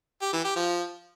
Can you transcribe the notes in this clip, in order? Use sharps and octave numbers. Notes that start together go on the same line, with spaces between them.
G4
E3
G4
F3